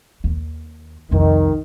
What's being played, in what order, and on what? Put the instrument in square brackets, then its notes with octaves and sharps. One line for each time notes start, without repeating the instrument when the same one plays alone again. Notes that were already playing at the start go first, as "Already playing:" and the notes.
[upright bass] D#2
[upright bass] C2 F2 [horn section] D#3